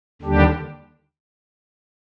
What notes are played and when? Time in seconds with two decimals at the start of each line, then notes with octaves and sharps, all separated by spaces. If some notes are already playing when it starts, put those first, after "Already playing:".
0.22 D#2 D3 G3 D4 G4